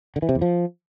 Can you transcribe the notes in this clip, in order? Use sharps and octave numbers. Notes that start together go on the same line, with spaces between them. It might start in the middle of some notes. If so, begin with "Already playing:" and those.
D3
E3
C3
E2
F3